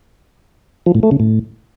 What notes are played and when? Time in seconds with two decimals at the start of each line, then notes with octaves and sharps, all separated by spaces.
0.86 F3
0.95 A2
1.03 A3
1.11 C#3
1.20 A2